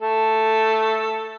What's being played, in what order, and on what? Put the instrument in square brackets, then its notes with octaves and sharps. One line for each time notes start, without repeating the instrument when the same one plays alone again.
[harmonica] A3 A4